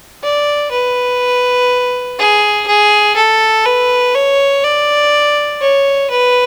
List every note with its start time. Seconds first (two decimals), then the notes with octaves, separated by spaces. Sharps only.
0.23 D5
0.72 B4
2.19 G#4
2.68 G#4
3.17 A4
3.66 B4
4.15 C#5
4.64 D5
5.61 C#5
6.11 B4